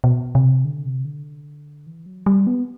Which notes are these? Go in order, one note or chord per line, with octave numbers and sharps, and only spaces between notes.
B2
C3
D3
C3
D3
E3
F#3
G3
B3